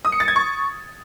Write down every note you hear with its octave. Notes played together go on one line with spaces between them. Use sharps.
D#6
C#7
A6
G#6
C#6